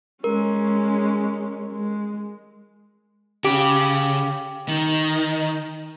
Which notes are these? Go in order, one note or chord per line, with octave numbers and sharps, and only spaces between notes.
G#3 C#4 A#4
G#3
C#3 G4
D#3